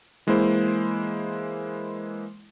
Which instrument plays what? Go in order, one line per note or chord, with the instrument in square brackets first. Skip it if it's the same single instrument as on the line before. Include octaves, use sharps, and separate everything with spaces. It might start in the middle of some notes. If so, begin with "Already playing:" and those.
[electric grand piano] E3 G#3 A#3 E4 C5